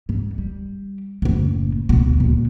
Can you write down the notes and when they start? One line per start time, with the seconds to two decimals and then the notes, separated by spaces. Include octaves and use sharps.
0.09 G#2
0.38 G3
1.22 F#1 A2
1.89 D2 B2
2.20 A#2 D3